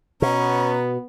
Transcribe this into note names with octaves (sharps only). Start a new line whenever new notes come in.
B2 B3 C#4 A#5